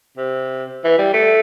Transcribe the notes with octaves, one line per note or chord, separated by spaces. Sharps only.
C3
E3
G3
A3